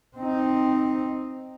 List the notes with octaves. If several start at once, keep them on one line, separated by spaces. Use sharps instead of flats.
C4 D#4